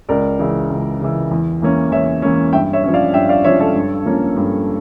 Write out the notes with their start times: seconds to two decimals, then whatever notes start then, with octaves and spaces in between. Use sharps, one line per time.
0.09 C#2 A#4 D5
0.39 C#3 E3
0.70 C#2
1.00 C#3 E3
1.31 E2
1.62 E3 A#3 C#4
1.92 E2 C#5 E5
2.22 E3 A#3 C#4
2.53 G2 E5 G5
2.73 C#5 E5
2.83 F3 C#4
2.94 D5 F5
3.14 G2 E5 G5
3.29 D5 F5
3.44 F3 C#4 C#5 E5
3.60 A4 C#5
3.75 G2
4.06 F3 A#3 C#4
4.37 G2